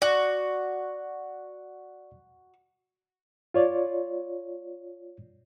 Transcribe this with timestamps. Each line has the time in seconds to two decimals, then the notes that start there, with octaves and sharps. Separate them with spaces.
0.02 F#4 D5
3.54 F4 C#5 D5